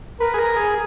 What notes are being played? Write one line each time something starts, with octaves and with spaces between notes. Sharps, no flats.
A#4 B4
G#4
A#4
G#4